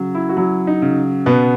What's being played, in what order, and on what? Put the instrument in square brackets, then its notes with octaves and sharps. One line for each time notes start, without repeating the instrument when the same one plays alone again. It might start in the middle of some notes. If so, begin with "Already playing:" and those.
Already playing: [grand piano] C#3 F#3
E4
F#4
F#3 E4
D#4
C#3
B2 B3